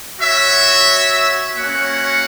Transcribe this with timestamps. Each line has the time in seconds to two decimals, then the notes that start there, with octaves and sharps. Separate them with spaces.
0.19 F#4 C#5 E5
1.56 A#3 C#4 F#4 C#5 F#5